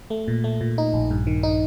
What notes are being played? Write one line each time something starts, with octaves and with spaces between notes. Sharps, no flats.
A3
A#2
A3
A#2
D#4
A#1
G2
D#3
D#4